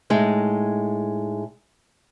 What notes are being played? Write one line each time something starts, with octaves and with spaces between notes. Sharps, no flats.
A2 G#3 D#4